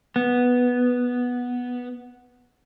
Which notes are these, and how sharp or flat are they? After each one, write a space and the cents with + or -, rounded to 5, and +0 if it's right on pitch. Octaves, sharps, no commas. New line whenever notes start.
B3 -5